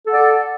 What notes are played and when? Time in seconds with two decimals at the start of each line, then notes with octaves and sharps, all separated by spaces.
0.06 A4
0.09 F#5
0.13 D5